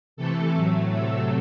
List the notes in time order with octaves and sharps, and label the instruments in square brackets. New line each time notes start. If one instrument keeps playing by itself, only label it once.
[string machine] C3 E3 A3 A4
A2 F#3 A3
C3 F#3 A3 A4